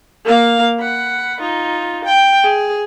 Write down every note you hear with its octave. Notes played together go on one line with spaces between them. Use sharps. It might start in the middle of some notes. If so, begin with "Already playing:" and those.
A#3 F5
F#5 B5
D#4 F4
G5
G#4